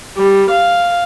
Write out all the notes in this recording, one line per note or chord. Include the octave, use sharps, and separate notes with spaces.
G3
F5